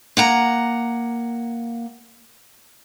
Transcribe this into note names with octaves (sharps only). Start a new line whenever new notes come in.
A#3 F#5 A#5